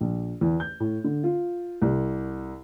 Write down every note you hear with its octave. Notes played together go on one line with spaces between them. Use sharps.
A#1
E2
G6
A2
D3
F4
C2